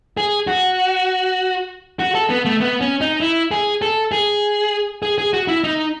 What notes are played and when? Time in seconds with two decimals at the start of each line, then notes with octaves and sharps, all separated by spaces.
0.17 G#4
0.47 F#4
1.99 F#4
2.15 A4
2.30 B3
2.45 A3
2.60 B3
2.81 C#4
3.01 D#4
3.21 E4
3.51 G#4
3.82 A4
4.12 G#4
5.03 G#4
5.18 G#4
5.33 F#4
5.48 E4
5.64 D#4